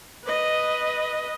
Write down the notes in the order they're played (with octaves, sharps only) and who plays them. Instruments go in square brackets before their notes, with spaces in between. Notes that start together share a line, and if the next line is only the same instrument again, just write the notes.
[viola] B4 D#5